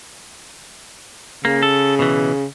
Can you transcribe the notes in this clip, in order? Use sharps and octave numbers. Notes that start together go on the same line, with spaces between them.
C#3 A#3
A4
B2 E3